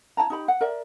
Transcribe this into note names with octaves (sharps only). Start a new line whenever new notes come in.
E4 G5 A5 A#5
D#4 G4 B5
F#5
A#4 D5 E5